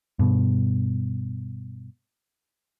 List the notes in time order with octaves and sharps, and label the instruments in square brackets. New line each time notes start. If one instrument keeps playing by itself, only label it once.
[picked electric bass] G2 B2